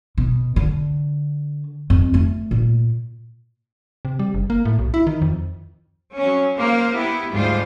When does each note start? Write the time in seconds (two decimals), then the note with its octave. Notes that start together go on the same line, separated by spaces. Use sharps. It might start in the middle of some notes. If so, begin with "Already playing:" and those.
0.18 B2
0.56 D3
1.90 F2
2.14 A3
2.51 A#2
4.05 C3
4.19 G3
4.34 F#1
4.50 A#3
4.65 A2
4.79 B1
4.94 E4
5.07 D#3
5.22 F2
6.18 F#3 C#4
6.58 A#3 C5
6.93 B3 E4 G4
7.32 D2 G#2 G3 F4 C5